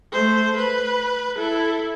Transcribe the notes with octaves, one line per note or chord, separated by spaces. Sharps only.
A3 C5
B4
E4 A4